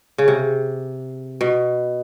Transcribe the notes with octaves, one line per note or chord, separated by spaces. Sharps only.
C#3
C3
B2